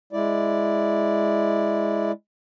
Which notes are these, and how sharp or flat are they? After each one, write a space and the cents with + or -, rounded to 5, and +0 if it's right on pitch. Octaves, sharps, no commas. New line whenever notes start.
G#3 +0 E4 +0 D5 +0